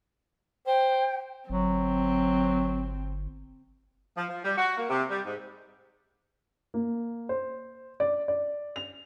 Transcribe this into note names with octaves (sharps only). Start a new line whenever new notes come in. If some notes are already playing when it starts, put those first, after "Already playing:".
C5 G5
G1 F#3 C4
F3
F3
G3
F#4
A#3
C3
G3
G#2
A#3
C5
D5
D5
F7